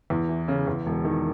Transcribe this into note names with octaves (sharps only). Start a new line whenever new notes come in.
E2
E3
C#3
E2
E1
D#3